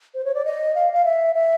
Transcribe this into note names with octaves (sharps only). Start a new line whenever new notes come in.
C5
C#5
D5
D#5
F5
F5
E5
E5